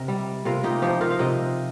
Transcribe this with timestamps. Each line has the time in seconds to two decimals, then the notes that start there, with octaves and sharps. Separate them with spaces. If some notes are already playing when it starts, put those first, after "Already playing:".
Already playing: C3 A#4 D#5
0.08 G3
0.45 C3 F4 A#4
0.64 D#4 G4
0.82 F3 D#4 G4
1.01 F4 A#4
1.10 F5
1.19 C3 D#5 G5